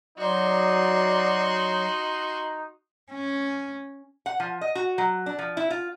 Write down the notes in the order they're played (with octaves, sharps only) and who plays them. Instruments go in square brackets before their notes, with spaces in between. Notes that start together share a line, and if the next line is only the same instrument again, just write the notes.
[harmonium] F#3 [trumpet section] D#4 [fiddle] F#4 C6 [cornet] D5
[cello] C#4
[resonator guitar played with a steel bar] F#5
F3
D#5
F#4
F#3
D4
F3
E4
F4